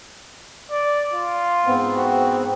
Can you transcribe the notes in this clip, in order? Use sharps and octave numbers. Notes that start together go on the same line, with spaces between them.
D5
F4
G#2 B3 C4
F#4